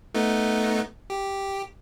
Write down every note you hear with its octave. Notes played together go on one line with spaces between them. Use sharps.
A3 B3 D#4
G4